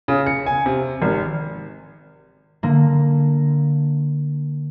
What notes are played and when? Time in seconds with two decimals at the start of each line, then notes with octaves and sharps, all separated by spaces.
0.08 C#3
0.26 C#7
0.46 G#5
0.66 C3
1.02 G#1
2.63 D3 A#3